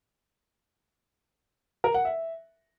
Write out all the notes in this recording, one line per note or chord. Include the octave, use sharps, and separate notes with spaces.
A#4
F#5
E5